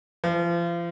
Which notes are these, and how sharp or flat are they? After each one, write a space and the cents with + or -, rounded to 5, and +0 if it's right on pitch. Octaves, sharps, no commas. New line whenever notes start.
F3 -35